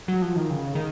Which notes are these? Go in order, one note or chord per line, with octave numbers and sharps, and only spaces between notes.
F#3
F3
D#3
C#3
D#3